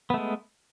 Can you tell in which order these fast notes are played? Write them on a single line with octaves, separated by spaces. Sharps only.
B3 A3 G#3